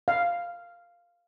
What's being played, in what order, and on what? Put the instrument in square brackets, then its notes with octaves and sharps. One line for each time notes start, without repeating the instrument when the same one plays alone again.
[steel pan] F5